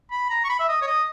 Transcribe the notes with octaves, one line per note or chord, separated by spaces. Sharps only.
B5
A#5
C#6
B5
E5
D#5
C#5
D#5